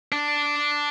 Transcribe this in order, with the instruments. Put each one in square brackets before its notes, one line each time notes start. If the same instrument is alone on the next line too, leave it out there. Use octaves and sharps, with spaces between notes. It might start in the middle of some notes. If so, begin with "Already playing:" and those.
[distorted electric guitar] D4